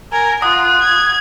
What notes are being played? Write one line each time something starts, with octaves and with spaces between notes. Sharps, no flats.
A#4 G#5
F4 F#5 D#6
G#6